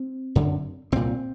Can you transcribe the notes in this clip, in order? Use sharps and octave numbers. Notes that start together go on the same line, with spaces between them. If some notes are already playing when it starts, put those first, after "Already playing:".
Already playing: C4
F#2 D3
C2 A#2 C4